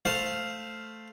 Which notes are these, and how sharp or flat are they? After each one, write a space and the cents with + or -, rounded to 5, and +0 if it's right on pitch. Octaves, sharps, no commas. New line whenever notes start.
A3 +0 C5 +0 F5 +0